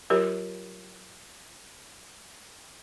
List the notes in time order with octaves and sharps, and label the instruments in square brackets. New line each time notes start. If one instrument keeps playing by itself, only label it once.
[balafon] F#3 F4 G4 A#4 C#5